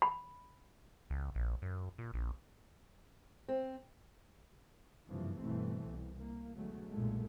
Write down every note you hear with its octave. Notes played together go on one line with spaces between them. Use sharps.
B5
C#2
A#1
F#2
A#2
A#1
C4
F#1 G2 C3 E3 F3
G1 B2 E3 A3 C4
C2
A#3
D2 B2 F#3 G#3 A3
B1 F#2 A#2 G#3 A3